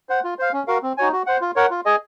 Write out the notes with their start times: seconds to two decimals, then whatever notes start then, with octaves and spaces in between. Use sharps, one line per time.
0.09 C5 F#5
0.24 F4
0.39 C5 F5
0.53 C#4
0.68 F#4 A#4 F5
0.83 C4
0.97 D#4 F#4 C#5 G#5
1.12 F#4
1.27 C5 F#5
1.41 F4
1.56 A#4 C#5 F#5
1.71 F4
1.86 G#4 D#5 G#5